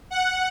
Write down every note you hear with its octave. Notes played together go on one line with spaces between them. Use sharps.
F#5